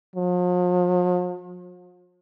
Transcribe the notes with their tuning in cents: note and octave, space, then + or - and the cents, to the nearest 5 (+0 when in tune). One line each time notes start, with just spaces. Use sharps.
F3 +45